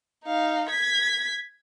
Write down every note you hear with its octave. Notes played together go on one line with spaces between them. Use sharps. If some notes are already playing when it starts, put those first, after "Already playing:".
D#4 F5
G#6 B6